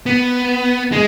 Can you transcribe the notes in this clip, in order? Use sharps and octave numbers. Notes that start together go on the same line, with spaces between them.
B3
G#3